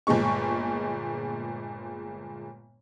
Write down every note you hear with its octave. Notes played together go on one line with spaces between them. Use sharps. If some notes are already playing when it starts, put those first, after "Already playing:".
G1 A#2 G#3 C#6